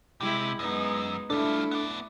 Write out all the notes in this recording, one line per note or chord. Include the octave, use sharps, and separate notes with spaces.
C3 G#3 E4 G4
F#2 G#3 B3 D#4
G3 A3 D4 E4 F4 A4
B3 D5